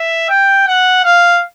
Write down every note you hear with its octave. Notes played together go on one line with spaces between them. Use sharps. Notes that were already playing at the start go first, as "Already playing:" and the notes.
Already playing: E5
G5
F#5
F5